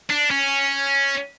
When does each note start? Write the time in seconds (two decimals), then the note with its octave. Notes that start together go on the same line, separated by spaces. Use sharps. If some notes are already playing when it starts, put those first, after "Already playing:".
0.10 D4
0.30 C#4